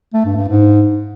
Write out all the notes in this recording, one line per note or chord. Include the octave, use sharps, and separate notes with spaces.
A3
G2
G2
G#2